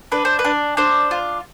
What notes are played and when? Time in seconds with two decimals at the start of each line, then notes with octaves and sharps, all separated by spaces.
0.12 D4 B4
0.25 C5
0.39 B4
0.45 D4
0.77 D4 C5
1.11 F4